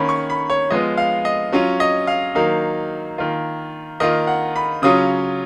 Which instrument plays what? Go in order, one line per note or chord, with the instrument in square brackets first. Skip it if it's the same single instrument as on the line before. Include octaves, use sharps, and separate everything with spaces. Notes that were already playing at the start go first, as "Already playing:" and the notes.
Already playing: [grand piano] D#3 A#3 C#4 B5
C#6
B5
C#5
F3 G#3 B3 F4 D#5
F5
D#5
F#3 C#4 F4
D#5
F5
D#3 F#3 A#3 D#4 F5
D#3 A#3 F4
D#3 A#3 F4 D#5
F#5
B5
C#3 F#3 C#4 F4 D#6